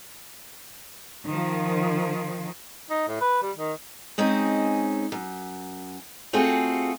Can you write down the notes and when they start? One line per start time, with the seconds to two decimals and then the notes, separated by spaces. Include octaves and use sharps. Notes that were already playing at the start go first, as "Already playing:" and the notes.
1.26 D#3 F3
2.90 D#4
3.08 A2
3.21 B4
3.42 G3
3.57 D#3
4.18 G#3 C4 C#4 D#4
5.12 F#2
6.33 A3 C4 F4 F#4 G#4 A4